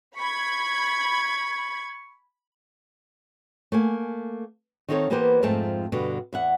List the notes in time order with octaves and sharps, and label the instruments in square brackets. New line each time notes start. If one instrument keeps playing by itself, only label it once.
[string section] B5 G#6 [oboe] C#6
[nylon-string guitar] A3 A#3 G#5
D#3 C4 D#4 F4 A4 C#5
E3 A#3 B3 G4 B4 C5
F2 G#2 F3 A3 C4 A5
G2 B2 D3
E2 E5 F#5